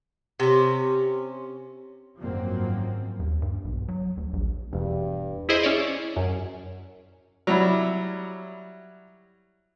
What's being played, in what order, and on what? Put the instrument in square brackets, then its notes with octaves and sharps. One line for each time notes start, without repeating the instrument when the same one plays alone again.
[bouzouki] C3 C#4
[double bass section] G#1 F#2 F3 F#3 A#3 C4
[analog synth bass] D#2
G2
B1
F#3
D2
A#1
[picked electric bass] E1 [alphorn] G2
[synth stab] E4 G#4 C5 D#5 E5
C#4 C#5 D5
F#2
[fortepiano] F#3 G3 E4